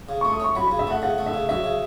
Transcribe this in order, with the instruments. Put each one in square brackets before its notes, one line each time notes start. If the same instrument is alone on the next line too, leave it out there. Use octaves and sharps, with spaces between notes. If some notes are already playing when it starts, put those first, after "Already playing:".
[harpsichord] C#3
[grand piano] C#6
[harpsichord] A3
[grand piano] D#6
[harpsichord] C#4 [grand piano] C#6
[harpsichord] F#3 [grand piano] B5
[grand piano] B5
[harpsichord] C#3
[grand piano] E5
[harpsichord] A3 [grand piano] F#5
[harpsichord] C#3 [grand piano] F#5
[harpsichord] A3
[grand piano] E5
[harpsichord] C#3
[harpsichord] F#3 [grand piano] E5
[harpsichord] C#3